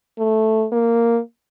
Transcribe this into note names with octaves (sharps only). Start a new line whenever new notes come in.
A3
A#3